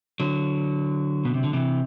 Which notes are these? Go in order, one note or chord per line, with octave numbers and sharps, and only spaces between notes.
D3 F#3
B2
C3
D3
C3 E3